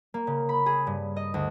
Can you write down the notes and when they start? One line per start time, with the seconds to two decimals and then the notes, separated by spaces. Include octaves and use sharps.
0.14 A#3
0.27 C#3
0.49 B5
0.66 G#4
0.87 G2
1.16 D#5
1.34 D2